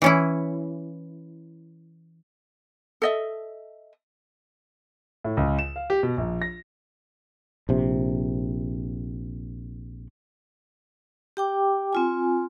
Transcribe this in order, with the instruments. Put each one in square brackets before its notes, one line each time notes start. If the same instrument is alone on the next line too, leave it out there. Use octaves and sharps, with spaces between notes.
[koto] E3 C#4 E4
[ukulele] A4 D#5 E5
[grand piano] A2
C#2
E7
F5
G4
B2
A#1
A#6
[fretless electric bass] A#1 C3
[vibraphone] G4 G5 D6
C4 F4 G#5